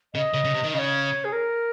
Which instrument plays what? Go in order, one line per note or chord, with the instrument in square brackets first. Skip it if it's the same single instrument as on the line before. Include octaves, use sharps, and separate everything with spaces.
[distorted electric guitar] C#3 [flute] D#5
[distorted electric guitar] C#3
C#3
C3
D#3
[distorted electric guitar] C#3 [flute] D#5
[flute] C#5
G#4
A#4